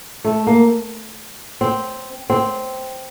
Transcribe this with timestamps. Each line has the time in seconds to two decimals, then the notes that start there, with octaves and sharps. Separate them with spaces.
0.25 A3
0.47 A#3
1.61 C4
2.30 C4